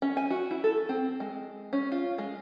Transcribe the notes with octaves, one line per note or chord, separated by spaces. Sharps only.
C#4
G#5
F#4
E4
A4
C4
G#3
C#4
F4
G#3